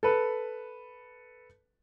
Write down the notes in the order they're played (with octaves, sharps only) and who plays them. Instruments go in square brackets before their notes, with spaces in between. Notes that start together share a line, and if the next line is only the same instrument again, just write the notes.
[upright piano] A4 B4